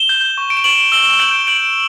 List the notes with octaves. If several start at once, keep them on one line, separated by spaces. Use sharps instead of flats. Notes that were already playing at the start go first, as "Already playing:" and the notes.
Already playing: E7 G7
G6
C#6
D7
E7
C#6 D7 F#7
E6 E7 G7
G6 D7 F#7
G6 D7 F#7